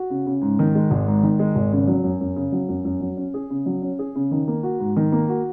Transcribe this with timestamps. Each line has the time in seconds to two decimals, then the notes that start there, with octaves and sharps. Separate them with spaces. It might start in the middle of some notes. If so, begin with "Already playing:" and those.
Already playing: F#4
0.10 C#3
0.26 C#3
0.42 G#2
0.59 D#3
0.75 G#3
0.91 G#1
1.07 G#2
1.23 D#3
1.39 G#3
1.55 G#1
1.72 C#3
1.87 F#3
2.04 F#2
2.21 F#2
2.36 C#3
2.52 F#3
2.69 F#2
2.85 F#2
3.01 F#3
3.17 C#4
3.34 G#4
3.50 C#3
3.66 F#3
3.82 C#4
3.99 G#4
4.15 C#3
4.31 D#3
4.48 A#3
4.63 F#4
4.79 G#2
4.96 D#3
5.12 A#3
5.29 F#4